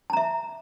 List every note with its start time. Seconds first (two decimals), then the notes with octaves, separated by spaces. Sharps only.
0.10 A5
0.13 A#5
0.17 E5